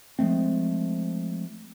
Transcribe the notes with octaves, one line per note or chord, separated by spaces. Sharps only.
F3 G#3 A3 C4